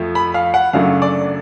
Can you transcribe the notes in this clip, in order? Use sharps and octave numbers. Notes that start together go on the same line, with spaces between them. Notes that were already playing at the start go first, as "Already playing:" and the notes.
Already playing: F2 F3 A3
B5
F5
F#5
F#2 C#3 F#3 A3 D4 F5
D5